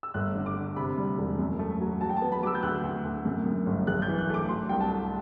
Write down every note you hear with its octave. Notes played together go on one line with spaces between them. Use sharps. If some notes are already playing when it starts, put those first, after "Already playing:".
E6
G1 F#6
D3
D6
D3
C3 B5
G3
E1
F#2
A3
F#3
F#3 A5
G5
B3 A5
B5
F#3 D6 E6
G6
D2 F#6
D2
D2
F#2
F#2
G1
B1 F#6
G6
E3
F#6
A3 D6
F#3 C6
C2 G5
A5
A3